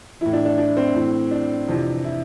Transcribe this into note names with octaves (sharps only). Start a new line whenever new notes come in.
A2 E3 E4
D4
D4
D4
C4
A2 E3
D4
F2 C3 E3
E4